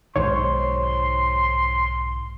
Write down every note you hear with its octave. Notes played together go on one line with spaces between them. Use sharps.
B1 G#2 D#3 C5 C#5 C6